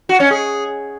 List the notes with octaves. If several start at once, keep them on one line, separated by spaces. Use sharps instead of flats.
F#4
C#4
G#4